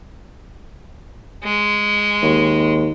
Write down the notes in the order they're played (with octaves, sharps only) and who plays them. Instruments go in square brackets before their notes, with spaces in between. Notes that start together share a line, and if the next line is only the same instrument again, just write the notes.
[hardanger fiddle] G#3
[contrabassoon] D#2